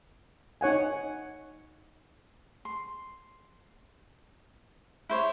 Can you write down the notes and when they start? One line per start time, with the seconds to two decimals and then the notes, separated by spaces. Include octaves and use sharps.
0.61 D#4 C#5 F#5 G#5
2.65 C6
5.09 E4 C5 C#5